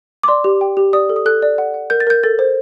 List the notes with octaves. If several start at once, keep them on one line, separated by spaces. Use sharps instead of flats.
D6
D5 C6
G4
G5
G4
D5 D#6
A4
D#6
A4 F#6
D5
F#5
F#5
A#4 G6
A6
A#4 G6
A4 A6
C5